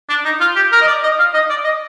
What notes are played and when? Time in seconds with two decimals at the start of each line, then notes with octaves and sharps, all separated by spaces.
0.09 D4
0.25 D#4
0.40 F4
0.56 G4
0.72 A#4
0.81 D#5
0.87 D5
1.03 D#5
1.19 F5
1.33 D#5
1.50 D5
1.64 D#5